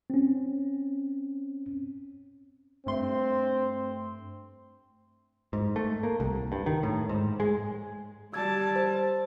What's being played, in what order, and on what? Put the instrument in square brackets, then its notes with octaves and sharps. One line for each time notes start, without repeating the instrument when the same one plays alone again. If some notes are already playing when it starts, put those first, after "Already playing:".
[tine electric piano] C4 C#4
[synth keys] G2 A3 C6 [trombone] C4
[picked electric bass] G#2
A3
A#3
C2
G2
D#3
A2
G#2
G#3
[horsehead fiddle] G3 A5 [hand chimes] E6 G#6
[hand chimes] C5